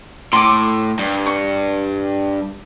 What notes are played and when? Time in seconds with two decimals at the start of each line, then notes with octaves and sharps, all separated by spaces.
0.33 A2 C6 D6
0.99 G2
1.26 C#6